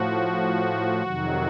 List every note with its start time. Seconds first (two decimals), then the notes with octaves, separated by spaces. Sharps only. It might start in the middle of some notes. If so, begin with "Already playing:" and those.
Already playing: A2 F3 F#4
1.02 F2 C3 D#3 F#3